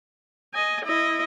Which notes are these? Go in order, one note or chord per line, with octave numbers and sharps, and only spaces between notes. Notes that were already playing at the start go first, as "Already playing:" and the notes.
D#5 G#5
E4 D#5